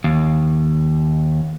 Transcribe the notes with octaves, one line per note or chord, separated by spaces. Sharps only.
D#2